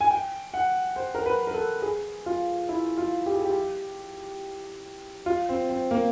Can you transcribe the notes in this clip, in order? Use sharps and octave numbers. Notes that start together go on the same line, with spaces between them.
G#5
G5
F#5
C5
A#4
B4
A#4
A4
G#4
F4
E4
F4
G4
G#4
G4
F4
C4
C4
A#3